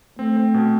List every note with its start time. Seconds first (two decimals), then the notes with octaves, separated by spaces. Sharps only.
0.18 A3 C4
0.37 C4
0.54 B2